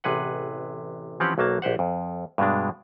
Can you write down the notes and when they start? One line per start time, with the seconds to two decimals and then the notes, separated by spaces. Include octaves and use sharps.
0.04 A1 C3 G#4 B4 F#5
1.20 E3 F3 C4 C#4 G4 F#5
1.38 B1 F#3 A#3 A5
1.62 A#1 G4 C5 F#5
1.79 F2
2.38 G2 B2 G#3 D4